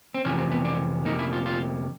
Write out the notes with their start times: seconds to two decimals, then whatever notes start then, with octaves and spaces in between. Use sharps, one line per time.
0.14 C4
0.25 F2 C3 E3 C#4
0.38 C4
0.51 B3
0.65 D4
1.05 F2 C3 F3 A#3 D#4
1.19 E4
1.33 F4
1.46 F4